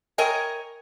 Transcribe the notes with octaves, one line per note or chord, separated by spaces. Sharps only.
A#4 C#5 D#5 G5 G#5